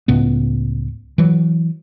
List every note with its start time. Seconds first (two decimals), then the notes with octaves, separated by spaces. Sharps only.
0.08 C#2 A2 B3
1.18 E3 F#3